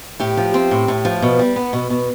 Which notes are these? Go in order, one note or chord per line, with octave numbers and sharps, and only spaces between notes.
A2 G4
F3
C4
A2
A2
F3
B2
G3
B3
B2
B2